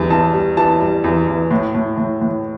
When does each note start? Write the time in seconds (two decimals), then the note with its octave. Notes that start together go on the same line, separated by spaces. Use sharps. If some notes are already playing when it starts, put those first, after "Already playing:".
Already playing: E2 G3
0.10 E2 A5
0.34 G3
0.57 E3 A5
0.81 G3
1.04 E2
1.28 E2
1.51 A2
1.74 A2
1.98 A2
2.22 A2